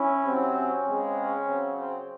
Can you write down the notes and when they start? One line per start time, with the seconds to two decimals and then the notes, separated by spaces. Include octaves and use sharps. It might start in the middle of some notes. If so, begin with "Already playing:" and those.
Already playing: C#4 E4
0.23 C3 F#3 C4
0.53 C#4
0.85 C#3 G#3 C4
1.16 C#4
1.47 C#3 F#3 C4
1.78 C4